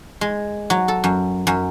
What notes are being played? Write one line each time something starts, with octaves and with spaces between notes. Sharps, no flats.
G#3
F#3
A4
F#2
F#2